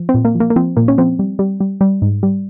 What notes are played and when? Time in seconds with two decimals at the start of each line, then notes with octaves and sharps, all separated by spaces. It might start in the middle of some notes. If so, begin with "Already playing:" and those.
Already playing: F3
0.09 C4
0.14 A#2
0.25 A#3
0.35 F3
0.40 A#3
0.50 A#3
0.56 F3 C4
0.77 A#2 A#3
0.88 C#4
0.98 F3 C4
1.19 G3
1.39 G3
1.60 G3
1.81 G3
2.02 G#2
2.23 G3